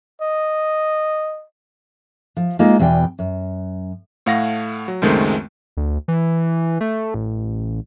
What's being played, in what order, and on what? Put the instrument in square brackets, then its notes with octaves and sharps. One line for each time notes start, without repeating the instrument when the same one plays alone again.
[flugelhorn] D#5
[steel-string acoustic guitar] F3
G#3 A#3 D#4 F4
E2 B2 G#4 D5 G5
F#2
[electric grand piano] A2 A3 F5 F#5 A#6
F#3
C#2 F#2 D#3 G#3 A3 C4
[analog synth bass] D2
E3
A3
A1